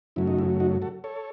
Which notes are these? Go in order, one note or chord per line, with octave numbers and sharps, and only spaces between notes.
F#2 C#3 F#3 A3 E4
D#4
E4
D#4 F#4
F#4 A4
A4 C#5